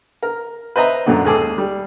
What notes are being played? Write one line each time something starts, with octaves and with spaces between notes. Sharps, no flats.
A#4
B4 C5 D#5 E5 A#5
F#2 A#2 D3
D#2 G#3 G#4 A4 D6
G3